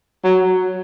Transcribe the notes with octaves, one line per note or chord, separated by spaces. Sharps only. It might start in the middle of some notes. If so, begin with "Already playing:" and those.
F#3